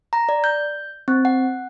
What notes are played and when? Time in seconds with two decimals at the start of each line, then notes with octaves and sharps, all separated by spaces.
0.13 A#5
0.29 D5
0.44 G6
1.08 C4
1.25 F#5